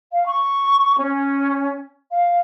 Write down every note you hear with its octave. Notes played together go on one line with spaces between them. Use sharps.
F5
C#6
C#4
F5